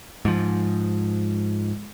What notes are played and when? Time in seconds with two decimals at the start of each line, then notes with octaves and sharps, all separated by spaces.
0.25 G#2 F3